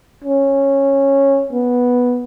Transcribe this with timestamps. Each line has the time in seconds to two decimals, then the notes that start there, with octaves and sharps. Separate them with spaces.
0.24 C#4
1.53 B3